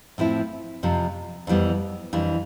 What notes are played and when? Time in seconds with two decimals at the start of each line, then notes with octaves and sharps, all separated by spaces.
0.18 A2 F3 C4 E4
0.83 F2 C3 F3
1.47 F2 E3 G3 B3
2.13 F2 E3 G3 D4